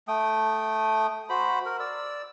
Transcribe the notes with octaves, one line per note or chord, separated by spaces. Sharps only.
A3 G5 D#6
F#4 C5 B5
A#4
D5 E6